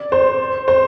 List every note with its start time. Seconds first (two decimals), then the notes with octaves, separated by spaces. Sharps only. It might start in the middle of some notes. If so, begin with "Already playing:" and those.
Already playing: D5
0.12 C5
0.68 C5